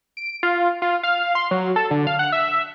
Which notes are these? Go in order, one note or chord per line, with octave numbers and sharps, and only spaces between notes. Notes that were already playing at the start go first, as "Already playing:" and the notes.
D7
F4
F4
F5
C6
F#3
A4
D3
F5
F#5
E5